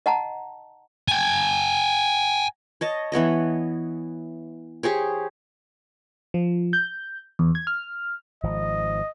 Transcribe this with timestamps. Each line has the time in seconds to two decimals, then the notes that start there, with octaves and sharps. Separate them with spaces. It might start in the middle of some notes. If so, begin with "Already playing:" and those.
0.06 D#5 F#5 A5 A#5
1.08 G5 G#5
2.81 C#5 D#5 A5
3.12 E3 B3 C#5 D#5
4.83 G4 G#4 C5 C#5
6.34 F3
6.73 G6
7.39 E2
7.55 G#6
7.67 F6
8.43 G#1 F3 D#5